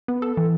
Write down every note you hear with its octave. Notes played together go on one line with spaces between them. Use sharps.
B3
A4
E3